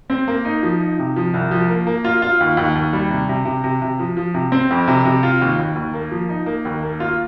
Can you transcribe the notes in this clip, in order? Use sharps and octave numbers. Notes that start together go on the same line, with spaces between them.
C4
A#3
D#4
F3
D#4
C3
F3
C2
F3
A#3
A#3
F4
F4
D#2
D#2
D#2
G3
C3
C3
C3
C3
C3
F3
F3
C3
C4
F2
C3
C3
F4
D#2
D#2
D#2
A#3
F3
D#4
A#3
D#2
A#3
F4